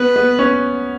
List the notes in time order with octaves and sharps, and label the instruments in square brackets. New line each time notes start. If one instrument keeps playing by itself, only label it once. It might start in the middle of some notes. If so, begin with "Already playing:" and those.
Already playing: [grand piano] B3 [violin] B4
[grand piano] B3
C#4